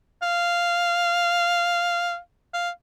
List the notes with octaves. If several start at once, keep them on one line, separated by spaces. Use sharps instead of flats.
F5
F5